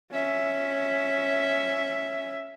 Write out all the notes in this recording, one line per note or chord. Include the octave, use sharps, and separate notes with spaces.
C#4 E5